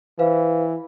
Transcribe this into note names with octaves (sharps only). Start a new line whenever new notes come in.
E3 B4 C5 F5